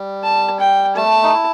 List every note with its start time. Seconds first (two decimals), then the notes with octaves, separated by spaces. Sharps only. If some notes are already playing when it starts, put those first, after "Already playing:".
Already playing: G3
0.23 A5
0.60 G5
0.96 A3 A5
1.23 D#4
1.33 E4